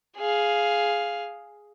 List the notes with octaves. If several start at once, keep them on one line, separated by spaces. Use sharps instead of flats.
G#4 F5